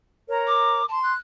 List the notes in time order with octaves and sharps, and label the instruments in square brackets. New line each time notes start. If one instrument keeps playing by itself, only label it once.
[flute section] A#4 C#5 A#5
[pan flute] D6
[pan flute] A5 [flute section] C6
[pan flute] F#6